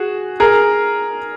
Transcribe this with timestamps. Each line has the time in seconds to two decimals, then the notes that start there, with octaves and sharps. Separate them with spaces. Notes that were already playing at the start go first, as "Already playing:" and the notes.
Already playing: F#4 G#4
0.40 G#4 A#4